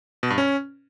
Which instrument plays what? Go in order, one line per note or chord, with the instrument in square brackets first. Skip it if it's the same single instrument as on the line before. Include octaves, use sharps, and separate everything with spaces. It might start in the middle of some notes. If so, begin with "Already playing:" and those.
[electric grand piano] B2
G2
C#4